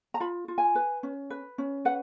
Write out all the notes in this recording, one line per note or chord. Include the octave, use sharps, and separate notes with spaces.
A#5
F4 B5
F4
G#5
B4
C#4
B4
C#4
B4 F#5